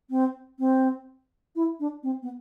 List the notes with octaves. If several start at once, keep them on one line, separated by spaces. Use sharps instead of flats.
C4
C4
E4
D4
C4
B3